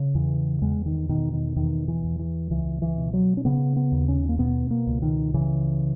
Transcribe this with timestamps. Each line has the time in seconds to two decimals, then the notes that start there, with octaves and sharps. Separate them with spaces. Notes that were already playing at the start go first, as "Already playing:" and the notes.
Already playing: C#3
0.15 E2 E3
0.61 E2 G#3
0.86 D#3
1.09 B2 D#3
1.33 D#3
1.56 E2 D#3
1.88 E3
2.04 E2
2.19 E3
2.50 C#2 E3
2.82 E3
2.97 B2
3.13 F#3
3.37 C#4
3.45 C#3 B3
3.76 B3
3.92 D#2
4.08 C#4
4.29 A#3
4.39 B2 B3
4.71 A#3
4.87 C#2
5.02 D#3
5.34 C#3 E3